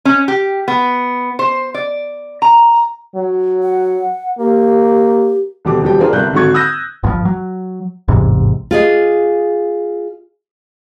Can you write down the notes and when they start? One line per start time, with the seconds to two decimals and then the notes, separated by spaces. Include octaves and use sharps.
0.05 C#4
0.28 G4
0.68 B3
1.39 C5
1.74 D5
2.42 A#5
3.15 F#3
3.62 F#5
4.39 A#3 G4
5.65 D#1 B2 D3 G4 D6
5.82 D#1 E2 F#3 G3 G4 G5
6.00 D4 F4 G#4 A#4 C5 D5
6.13 G1 C2 G2 A#4 F#6 G6
6.33 G#1 D3 F#3 F#4 C#6 G#6
6.54 D#6 E6 F#6 G6 A#6
7.03 G1 G2 C#3 F3
7.25 F#3
8.08 A1 E2 G#2 C3
8.71 F4 G#4 D#5